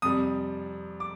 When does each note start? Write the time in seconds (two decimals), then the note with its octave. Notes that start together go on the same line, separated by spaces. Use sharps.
0.02 F2 C3 G3 D#6
1.00 D6